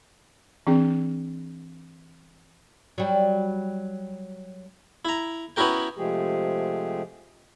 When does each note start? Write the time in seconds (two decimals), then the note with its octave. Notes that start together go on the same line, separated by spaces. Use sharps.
0.67 E3 C4 D4 G#4 G5
2.98 F#3 G3
5.05 E4 A#5
5.56 B3 C#4 E4 F#4 A#4 G5
5.98 C3 F3 G#3 A3 G4 G#4